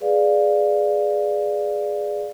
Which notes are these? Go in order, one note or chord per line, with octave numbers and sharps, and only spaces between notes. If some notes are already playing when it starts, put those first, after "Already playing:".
G#4 B4 D5 F5